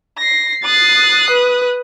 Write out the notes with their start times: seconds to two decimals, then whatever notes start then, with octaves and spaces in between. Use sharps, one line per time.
0.18 A#6 C7
0.65 D#6 F#6 A6 C7
1.30 B4